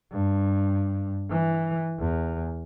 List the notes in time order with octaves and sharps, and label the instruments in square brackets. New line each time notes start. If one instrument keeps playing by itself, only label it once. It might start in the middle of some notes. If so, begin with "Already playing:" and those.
[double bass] G2
E3
E2